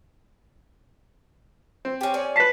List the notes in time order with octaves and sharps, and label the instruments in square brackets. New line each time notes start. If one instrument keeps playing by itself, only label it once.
[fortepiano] C4
[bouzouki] C#4 G4
C#4 D5
[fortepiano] B4 A5 [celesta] B6 C7